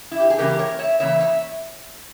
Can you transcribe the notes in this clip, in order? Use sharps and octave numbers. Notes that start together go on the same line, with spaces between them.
E4
G4
G#4
C#3 E3 A#3 G4 A#4
A#4 C#5
C#5 E5
C#3 E3 A#3 C#5 E5
C#5 E5